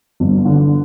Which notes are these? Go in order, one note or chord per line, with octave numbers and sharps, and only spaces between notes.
G1
D3